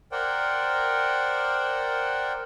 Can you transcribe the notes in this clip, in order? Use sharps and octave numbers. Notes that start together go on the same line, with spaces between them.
A#4 C5 D5 F#5 G5